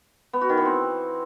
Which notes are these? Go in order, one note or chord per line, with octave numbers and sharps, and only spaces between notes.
B3
F#4
D#3
E3
C4